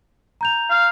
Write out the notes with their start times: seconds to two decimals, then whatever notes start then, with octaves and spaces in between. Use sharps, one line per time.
0.41 A#5 G6 F7
0.70 F5